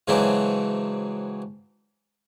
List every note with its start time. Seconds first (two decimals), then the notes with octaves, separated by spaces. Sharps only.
0.08 G#2 C#3 E3 F#3 C4 D4